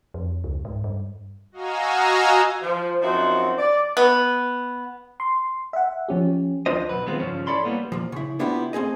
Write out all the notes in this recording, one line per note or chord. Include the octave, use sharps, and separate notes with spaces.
F2
C#2
G#2
G2
F#4 D#5 F5 G#5 A#5 E6
F3
F#2 F3 C4 D#4 F#4
D5
B3
C6
E5 F#5
F3 C#4 G4
D2 F3 D4 F4 C5 D#5
B1 A#2 F#3 B4
D#3 G#3 B3 C4 F4
G2 C#3 E3 F3 C#4
E4 A4 C#5 D5 B5 C6
G3 A#3 B3
A#2 F3
C#3 E4
B3 D4 E4 F4 G4
A3 C4 G#4 D#5